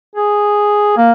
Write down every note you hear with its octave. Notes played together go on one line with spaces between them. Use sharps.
G#4
A#3